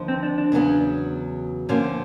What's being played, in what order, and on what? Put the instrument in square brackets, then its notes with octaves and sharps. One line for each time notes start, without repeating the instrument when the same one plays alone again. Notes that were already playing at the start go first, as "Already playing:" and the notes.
Already playing: [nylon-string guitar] D#2 D3 F3
[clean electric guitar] C4
D4
D4
[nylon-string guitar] E2 C#3 F#3 B3
[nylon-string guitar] G2 D3 F3 A#3 [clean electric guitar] C#4